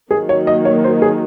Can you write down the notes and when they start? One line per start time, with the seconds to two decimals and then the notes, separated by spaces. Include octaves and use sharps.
0.11 D#3 F#3 A#3 G#4
0.29 C#5
0.47 D#5
0.65 C#5
0.84 C5
1.02 G#4